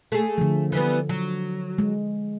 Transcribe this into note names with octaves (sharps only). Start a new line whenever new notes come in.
A3 G#4
D3 F3
E3 G3 B3
F#3
G#3